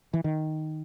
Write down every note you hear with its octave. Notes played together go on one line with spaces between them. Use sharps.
E3
D#3